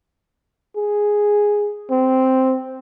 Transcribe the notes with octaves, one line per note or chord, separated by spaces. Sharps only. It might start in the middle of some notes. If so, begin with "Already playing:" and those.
G#4
C4